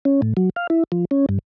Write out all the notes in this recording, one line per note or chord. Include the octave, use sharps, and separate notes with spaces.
C#4
A2
F#3
F5
E4
F3
C#4
G2